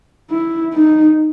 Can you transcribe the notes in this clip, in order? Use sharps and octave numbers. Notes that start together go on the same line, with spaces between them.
E4
D#4